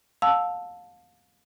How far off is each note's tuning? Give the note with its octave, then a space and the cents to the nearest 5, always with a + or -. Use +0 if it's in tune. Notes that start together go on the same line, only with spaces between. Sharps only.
F5 +30 A5 +0 E6 +0